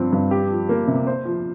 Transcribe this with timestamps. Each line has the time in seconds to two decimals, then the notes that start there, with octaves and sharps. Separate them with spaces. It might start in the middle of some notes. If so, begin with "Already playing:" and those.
Already playing: G2 F3 C4
0.13 G2
0.31 G4
0.50 F3
0.69 A#3
0.88 C3
1.07 C5
1.25 F3